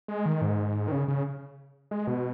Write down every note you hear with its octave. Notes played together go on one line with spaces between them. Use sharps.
G#3
D#3
G#2
D#3
C#3
C#3
G#3
B2